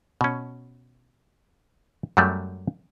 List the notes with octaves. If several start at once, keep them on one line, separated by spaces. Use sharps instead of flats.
B2 C#4
F#2 F#3 G3 A3